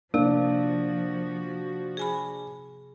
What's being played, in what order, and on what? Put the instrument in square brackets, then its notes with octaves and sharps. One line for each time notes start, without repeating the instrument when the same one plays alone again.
[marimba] C3 [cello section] F3 F#4 [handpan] A#3 [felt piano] D4
[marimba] G#4 G#5 B5